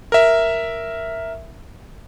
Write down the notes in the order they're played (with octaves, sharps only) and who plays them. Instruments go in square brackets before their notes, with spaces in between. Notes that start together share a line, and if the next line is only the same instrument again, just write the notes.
[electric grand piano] A#4 E5